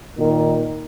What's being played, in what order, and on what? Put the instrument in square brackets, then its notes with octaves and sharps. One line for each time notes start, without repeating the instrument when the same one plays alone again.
[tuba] A#2 [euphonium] D#3